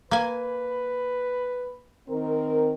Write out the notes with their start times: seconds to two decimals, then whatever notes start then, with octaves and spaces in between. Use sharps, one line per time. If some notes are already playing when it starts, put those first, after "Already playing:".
0.11 A#3 B4 G#5
2.08 D#3 C4 A#4